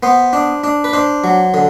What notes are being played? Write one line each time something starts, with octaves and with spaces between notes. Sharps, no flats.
B3 C5
D4
D4
B4
D4 C5
F#3
D3